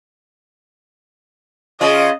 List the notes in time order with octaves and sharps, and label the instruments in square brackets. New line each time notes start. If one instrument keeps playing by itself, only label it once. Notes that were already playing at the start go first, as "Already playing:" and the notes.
[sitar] C#3 F4 [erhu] D#5